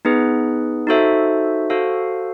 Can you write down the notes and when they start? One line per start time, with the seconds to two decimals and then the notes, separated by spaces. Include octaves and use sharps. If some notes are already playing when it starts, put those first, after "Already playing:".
0.05 B3 D#4 G#4 B4
0.87 D#4 F#4 A4 C5 E5
1.70 F#4 A4 C5 F5